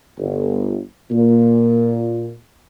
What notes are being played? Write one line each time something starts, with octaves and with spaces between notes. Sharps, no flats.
G1
A#2